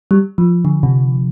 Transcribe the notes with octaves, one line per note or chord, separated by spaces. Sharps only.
G3
F3
D3
C3